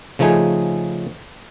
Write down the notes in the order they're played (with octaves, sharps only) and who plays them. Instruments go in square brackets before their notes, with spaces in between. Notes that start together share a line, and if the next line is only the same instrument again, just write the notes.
[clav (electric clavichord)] C#3 F3 A3 D#4 G#4